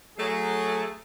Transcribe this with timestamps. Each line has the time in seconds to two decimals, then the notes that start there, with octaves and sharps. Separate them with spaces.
0.18 F#3 A3 G#4